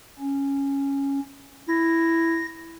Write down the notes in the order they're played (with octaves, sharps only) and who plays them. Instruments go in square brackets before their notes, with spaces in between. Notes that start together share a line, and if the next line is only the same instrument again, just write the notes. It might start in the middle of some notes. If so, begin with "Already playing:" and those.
[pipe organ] C#4
[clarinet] E4 [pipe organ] A#6